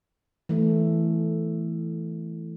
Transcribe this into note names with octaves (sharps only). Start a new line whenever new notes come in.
E3 A3